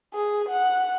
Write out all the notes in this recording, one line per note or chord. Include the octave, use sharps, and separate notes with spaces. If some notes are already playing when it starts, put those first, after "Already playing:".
G#4
F#5